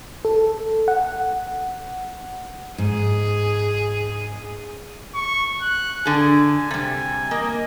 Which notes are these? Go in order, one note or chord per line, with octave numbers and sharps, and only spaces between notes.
A4
F#5
G#2 G#4
C#6
F#6
D3 G#4 G#5
C3 G3
A#3 D#5